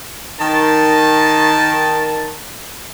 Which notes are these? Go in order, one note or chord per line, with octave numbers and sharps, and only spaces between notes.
D#3 A5